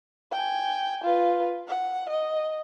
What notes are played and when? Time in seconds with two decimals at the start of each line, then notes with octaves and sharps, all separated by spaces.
0.31 G5 G#5
1.03 F4 B4
1.68 F#5
2.09 D#5